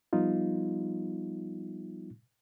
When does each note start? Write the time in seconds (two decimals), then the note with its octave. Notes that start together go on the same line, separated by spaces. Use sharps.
0.13 F3 G3 B3 D#4 F4